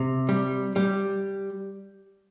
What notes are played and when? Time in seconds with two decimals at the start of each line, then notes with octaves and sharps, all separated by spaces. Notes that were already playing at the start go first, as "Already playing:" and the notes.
Already playing: C3
0.29 G3
0.76 G3